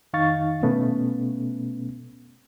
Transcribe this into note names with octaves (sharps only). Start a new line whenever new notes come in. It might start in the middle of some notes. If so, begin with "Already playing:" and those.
F2 D#3 D#4 F5 C#6 A6
B2 A3 B3 C#4